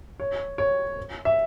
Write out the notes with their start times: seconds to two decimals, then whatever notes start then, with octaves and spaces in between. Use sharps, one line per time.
0.20 C#5
0.58 C#5
1.25 E5